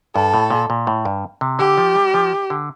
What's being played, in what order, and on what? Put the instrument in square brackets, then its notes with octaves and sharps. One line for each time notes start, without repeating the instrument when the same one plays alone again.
[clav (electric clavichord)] G2 [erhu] A4
[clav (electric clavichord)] A2
A#2
A#2
A2
G2
C3
[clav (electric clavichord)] D3 [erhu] G4
[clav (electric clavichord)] F3
G3
F3
D3